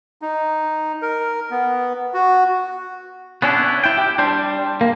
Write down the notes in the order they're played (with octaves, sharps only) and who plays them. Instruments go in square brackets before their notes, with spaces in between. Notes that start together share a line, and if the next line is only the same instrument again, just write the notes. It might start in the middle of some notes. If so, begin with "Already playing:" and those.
[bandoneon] D#4
A#4
B3
F#4
[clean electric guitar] B3 C#4 D4 E4
E4 G5
G4
G3 D4 C5
A#3